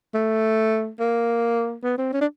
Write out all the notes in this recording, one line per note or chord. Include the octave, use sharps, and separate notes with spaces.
A3
A#3
B3
C4
C#4
D4